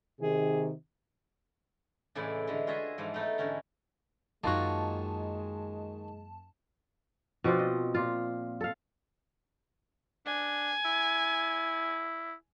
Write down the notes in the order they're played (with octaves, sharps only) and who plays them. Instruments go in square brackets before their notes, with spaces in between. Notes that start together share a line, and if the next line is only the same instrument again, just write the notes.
[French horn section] C3 D#3 [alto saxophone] G#4
[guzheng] A2 C#3 E3 G#3 E4 D5
D3 E3 G#3
F4 F#4 G#4 C#5 D#5 E5
G#2 E3 F3
A3 B3 D#4 E4 A4
G#2 D3 E3 C#4 A#5
[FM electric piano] F#2 A5 [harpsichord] D#3 C#5 [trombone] G#3 [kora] A#3 F4 F#4
[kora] B2 F3 C4 D4
D#5
A#2 F4
A4 F5
[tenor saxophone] D4 [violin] G#5
[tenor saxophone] E4